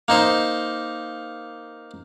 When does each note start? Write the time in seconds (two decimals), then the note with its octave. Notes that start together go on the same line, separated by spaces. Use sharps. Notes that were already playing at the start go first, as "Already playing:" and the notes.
0.08 A#3 D#4 C5